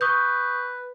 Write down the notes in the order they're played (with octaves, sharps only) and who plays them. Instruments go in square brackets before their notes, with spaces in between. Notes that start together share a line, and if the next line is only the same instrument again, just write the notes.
[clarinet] B4 [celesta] C#6 D#6 G6